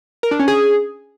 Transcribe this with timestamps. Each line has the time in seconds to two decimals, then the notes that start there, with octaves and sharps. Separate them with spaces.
0.23 A#4
0.31 D4
0.39 C#4
0.48 G#4